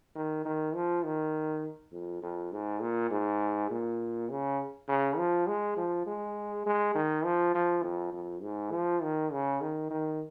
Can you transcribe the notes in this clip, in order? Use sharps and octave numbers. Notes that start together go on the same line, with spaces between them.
D#3
D#3
F3
D#3
F2
F2
G#2
A#2
G#2
A#2
C#3
C#3
F3
G#3
F3
G#3
G#3
D#3
F3
F3
F2
F2
G#2
F3
D#3
C#3
D#3
D#3